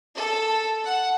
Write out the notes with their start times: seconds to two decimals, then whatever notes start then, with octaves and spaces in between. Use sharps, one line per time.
0.15 A4
0.84 F#5